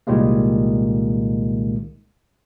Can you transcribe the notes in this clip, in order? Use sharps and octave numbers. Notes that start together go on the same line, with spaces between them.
C2 A#2 D#3 G3 G#3 A#3